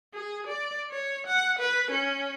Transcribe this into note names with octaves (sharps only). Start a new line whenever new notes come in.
G#4
D5
C#5
F#5
B4
C#4